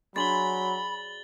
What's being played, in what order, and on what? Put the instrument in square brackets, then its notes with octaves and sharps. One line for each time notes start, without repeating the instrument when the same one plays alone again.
[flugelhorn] F#3 [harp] D4 G#4 C5 [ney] B5 [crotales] A6 F#7 G7